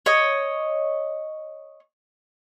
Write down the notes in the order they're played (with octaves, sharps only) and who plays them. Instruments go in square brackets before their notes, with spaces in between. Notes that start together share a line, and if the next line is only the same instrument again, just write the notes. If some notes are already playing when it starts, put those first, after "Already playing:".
[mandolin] C#5 D#5